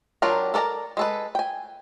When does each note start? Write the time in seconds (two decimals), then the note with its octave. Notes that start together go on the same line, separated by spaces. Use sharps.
0.22 F#3 D4 F4 G4 A#4
0.54 A4 A#4 D5 A5 A#5
0.97 G#3 A4 B4
1.35 G5 G#5